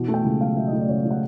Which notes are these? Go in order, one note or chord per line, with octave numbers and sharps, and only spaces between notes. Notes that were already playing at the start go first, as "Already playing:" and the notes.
Already playing: B2 E3
A3
G5
C#2
F#3 F5
B2 E5
D#5
A3
D5
C#2 C#5
F#3
F#5